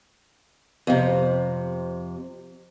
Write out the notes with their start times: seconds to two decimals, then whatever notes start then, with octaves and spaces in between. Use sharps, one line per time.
0.87 F2 C3